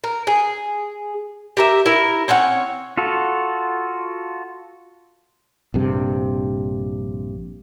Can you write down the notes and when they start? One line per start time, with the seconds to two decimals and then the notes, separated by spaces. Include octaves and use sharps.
0.04 A#4
0.27 G#4
1.57 G4 A#4 E5
1.86 E4 A#4
2.28 C4 C#4 C#5 F#5
2.97 F4 F#4 A4
5.74 A#1 G2 C3